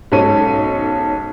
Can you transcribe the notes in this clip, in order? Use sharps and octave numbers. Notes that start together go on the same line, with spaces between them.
B1 G#2 C#4 A4 C#5 D#7